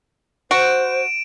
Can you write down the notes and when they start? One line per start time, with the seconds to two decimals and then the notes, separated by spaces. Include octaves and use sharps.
0.51 F#4 C5 D7 E7